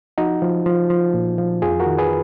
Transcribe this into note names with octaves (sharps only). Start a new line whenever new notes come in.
F3 D#4 F#4
F3
F3
F3
A#2
F3
F2 F4 G#4
F#4 A#4
D#3
G#4 B4